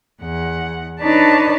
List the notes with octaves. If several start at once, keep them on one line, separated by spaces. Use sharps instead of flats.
E2 F#5
D4 D#4 B4 C#5 D5 A5